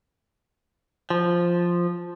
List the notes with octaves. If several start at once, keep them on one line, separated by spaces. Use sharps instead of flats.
F3